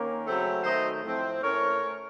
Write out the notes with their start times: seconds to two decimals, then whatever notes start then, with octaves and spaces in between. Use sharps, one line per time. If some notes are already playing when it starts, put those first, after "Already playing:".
Already playing: D#3 A#3 C#4
0.26 C#3 F#3 A3 C4
0.64 D#3 F#3 A3 C5 D#5
1.04 A2 F3 A3 C4
1.42 A2 A3 C#4 A#4 C#5